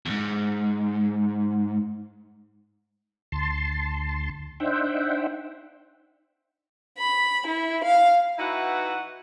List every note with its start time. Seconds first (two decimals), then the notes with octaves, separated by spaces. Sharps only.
0.06 E2 G#2
3.32 D2 A5 C6
4.60 D4 D#4 C5 E5 F#5 G5
6.98 B5
7.47 E4
7.84 F5
8.38 E3 D#4 E4 F#4 B4 F#5